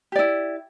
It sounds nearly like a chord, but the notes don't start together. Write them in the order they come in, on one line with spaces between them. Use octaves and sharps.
G4 D5 E4